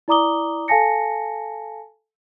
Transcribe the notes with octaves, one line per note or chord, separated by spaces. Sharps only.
E4 D5 A#5 D6 D#6 G7
A4 F5 G#5 A5 A#6 C#7